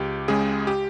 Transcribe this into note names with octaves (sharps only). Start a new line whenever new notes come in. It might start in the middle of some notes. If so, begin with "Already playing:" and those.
Already playing: C#2 G4
C#3 G#3 G#4
G4